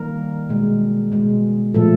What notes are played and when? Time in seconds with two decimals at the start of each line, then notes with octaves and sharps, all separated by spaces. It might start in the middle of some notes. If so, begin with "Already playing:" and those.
Already playing: D#3 G3 A#3 A#4
0.49 B2 G#3
1.12 B2 G#3
1.74 A#2 F3 A3 A4